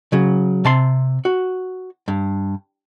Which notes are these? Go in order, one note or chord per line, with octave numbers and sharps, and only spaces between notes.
C#3 F#3
C3 A5 C6
F#4
G2